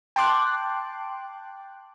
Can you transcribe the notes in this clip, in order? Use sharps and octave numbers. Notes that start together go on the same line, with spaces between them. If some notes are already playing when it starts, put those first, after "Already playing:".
G5 A5 C6 D6 F#6